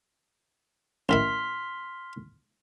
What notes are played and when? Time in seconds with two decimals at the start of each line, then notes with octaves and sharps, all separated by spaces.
1.09 A1 D#3 E4 C6 F6 B6